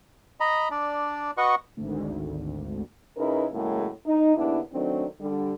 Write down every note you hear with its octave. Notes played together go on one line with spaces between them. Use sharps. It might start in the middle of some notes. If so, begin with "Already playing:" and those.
D#5 A#5 B5
D4 D5
F#4 B4 D#5 F#5 C#6
G#1 D2
C#3 D#4 E4 A#4 B4
A2 C#3 F#3 G#3 A#3
D#4
D#2 C#3 B3 D4 E4
D#3 F#3 A3 C4 D4
D3 G3